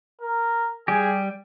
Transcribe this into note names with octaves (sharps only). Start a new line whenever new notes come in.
A#4
G3 G4 G#4